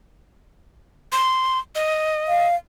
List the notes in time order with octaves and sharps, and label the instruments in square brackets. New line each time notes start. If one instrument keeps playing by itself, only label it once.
[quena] C6
D#5
[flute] F5